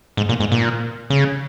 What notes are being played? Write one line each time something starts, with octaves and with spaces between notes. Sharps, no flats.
G#2
A#2
G#2
A#2
C#3